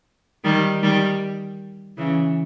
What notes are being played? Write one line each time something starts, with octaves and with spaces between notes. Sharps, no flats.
D#3 G3
D#3 G3
C#3 E3